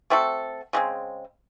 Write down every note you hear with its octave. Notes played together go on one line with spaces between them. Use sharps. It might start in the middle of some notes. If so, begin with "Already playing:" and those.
A3 C4 F#4 A4
C#3 G#3 C4